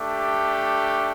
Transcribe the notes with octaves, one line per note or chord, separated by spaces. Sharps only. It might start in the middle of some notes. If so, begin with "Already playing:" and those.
Already playing: A3 D4 G4